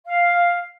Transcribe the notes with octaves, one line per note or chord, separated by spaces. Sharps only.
F5